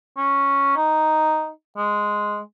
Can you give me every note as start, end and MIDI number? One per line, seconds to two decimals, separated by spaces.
0.17 0.73 61
0.76 1.50 63
1.77 2.40 56